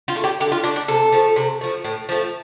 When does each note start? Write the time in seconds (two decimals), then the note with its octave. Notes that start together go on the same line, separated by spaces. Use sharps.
0.08 F4
0.16 A3
0.24 G4
0.40 D3 G4
0.52 F4
0.64 A3 D4
0.76 D4
0.88 C3 A4
1.13 F3 A3
1.36 C3
1.61 F3 A3
1.84 A2
2.09 F3 A3